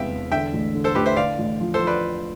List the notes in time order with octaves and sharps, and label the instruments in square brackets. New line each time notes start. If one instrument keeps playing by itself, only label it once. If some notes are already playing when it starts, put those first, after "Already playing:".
Already playing: [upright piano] E1 E2 C3 B3 [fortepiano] E5 F5 G5
[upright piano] E1
[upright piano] D3 [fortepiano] E5 G5
[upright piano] A1
D3
[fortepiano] A4 C5
[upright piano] A1 [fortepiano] G4 B4
[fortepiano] C5 E5
[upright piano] D3 [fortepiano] D5 F5
[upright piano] A1
F3
[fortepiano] A4 C5
[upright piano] F3
[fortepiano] B4 D5